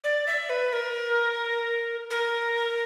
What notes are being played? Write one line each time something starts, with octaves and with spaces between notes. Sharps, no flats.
D5
E5
B4
A#4
A#4